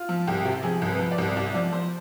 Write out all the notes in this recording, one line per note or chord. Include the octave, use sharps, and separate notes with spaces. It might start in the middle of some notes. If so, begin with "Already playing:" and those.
Already playing: F4
F3
C2 G4
C3
F3 G#4
C2
B4
F3
D5
C2
C2 D5
F3 D5
F3 C5